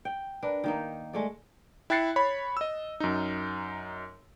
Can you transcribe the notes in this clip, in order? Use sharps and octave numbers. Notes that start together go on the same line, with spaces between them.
G5
D4 A#4 B4
D#3 A#3 D#4
G#3 A3 D5
E4 G5 F#6 A6 C7 C#7
C#5 B5
D#5 E6
F#2 D#4